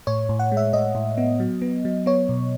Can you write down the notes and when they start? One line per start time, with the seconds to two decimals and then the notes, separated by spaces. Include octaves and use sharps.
0.07 A2 C#5
0.29 A2
0.39 F#5
0.52 G#3
0.57 E5
0.73 A2 D#5
0.95 A2
1.18 B3
1.40 F#3
1.62 B3
1.85 F#3
2.06 B3 C#5
2.29 B2